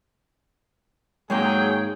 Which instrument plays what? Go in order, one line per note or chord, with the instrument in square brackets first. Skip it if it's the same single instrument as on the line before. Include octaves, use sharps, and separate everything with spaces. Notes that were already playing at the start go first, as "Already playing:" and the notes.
[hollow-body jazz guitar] G#2 G#3 A#3 [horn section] F#3 G#4 [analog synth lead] C#5 [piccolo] G5